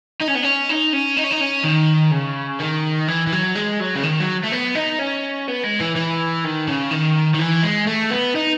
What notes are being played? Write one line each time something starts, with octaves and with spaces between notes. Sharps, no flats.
D#4
C#4
B3
C#4
D#4
C#4
D#4
C#4
D#4
C#4
D#3
C#3
D#3
E3
E3
F#3
G#3
F#3
C#3
D#3
F#3
A3
B3
D#4
C#4
B3
G#3
E3
E3
D#3
C#3
D#3
D#3
E3
G#3
A3
B3
D#4